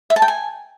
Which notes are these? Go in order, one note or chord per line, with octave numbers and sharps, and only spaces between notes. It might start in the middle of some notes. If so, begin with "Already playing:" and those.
E5
A5
G5
G#5